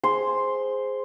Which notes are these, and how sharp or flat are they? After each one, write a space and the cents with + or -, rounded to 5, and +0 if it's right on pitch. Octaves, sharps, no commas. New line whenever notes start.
G#4 +0 C5 +0 C6 +0